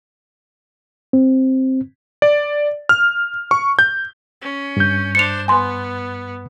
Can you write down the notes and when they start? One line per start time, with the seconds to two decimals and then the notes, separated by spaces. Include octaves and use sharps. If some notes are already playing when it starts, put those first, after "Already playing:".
1.13 C4
2.22 D5
2.89 F6
3.51 C#6
3.79 G6
4.41 C#4
4.77 G2 G6
5.15 D4 C5 C#7 F7
5.48 B3 G#5 C6